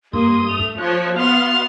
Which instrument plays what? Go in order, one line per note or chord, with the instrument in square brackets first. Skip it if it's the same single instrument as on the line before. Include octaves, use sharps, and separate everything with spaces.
[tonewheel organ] G2 D#6 [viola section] A#3 [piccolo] C6
[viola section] A3 [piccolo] F7
[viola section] F3 [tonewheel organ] C#5 [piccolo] F#6
[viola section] B3 F#4 C6 [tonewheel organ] F5 [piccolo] F7